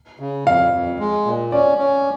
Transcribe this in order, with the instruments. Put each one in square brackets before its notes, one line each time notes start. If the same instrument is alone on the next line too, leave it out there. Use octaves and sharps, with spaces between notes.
[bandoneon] C#3
[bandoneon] F2 [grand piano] F5
[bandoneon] F2
G#3
A#2
[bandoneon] C#4 [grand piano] D5
[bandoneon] C#4